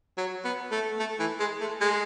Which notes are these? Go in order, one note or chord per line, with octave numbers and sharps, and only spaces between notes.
F#3
B3
A3
A3
E3
G#3
A3
G#3